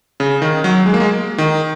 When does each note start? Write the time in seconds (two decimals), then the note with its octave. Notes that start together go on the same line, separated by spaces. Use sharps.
0.20 C#3
0.42 D#3
0.64 F#3
0.86 G#3
0.94 A#3
1.00 G#3
1.38 D#3